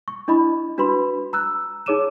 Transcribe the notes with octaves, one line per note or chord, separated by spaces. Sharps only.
C#6
D4 E4 D#5 B5
D4 F#4 B4 B5 C6
A#5 E6 F#6
D#4 G#4 C#5 D6 D#7 E7